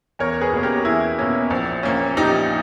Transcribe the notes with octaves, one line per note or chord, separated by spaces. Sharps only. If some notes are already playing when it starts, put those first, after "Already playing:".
E2 A#4 C#5
G#4 B4
B2 A#3 C#4
G4 A#4
E2 E4 G#4
B2 A#3 C#4
A#1
A#2 A#3 C#4
A#1 D#4 G4